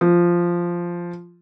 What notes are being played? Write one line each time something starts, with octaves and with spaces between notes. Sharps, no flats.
F3